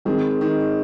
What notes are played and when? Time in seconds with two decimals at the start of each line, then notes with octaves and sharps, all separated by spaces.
0.05 D#3 G#3 C4
0.41 D#3